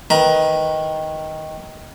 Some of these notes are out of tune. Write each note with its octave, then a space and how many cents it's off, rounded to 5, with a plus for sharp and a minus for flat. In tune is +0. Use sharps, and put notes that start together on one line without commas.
D#3 +10 B4 +0 A#5 +25